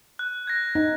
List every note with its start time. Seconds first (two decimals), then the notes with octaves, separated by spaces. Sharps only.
0.19 F#6
0.47 G#6 A#6
0.75 D#4